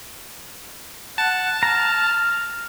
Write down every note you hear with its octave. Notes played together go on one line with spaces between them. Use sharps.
F#5 A5
A#5 F6